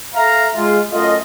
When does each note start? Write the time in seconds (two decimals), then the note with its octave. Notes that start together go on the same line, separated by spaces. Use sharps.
0.15 A4 E5 F5 A#5
0.55 G#3 F4
0.92 F#2 A3 F4 D#5